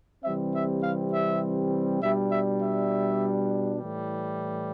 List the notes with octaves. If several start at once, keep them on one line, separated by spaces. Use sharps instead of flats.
C3 E3 G3 C4 E5
E5
F5
E5
B2 G3 D4 E5
E5
E5
A2 E3 G3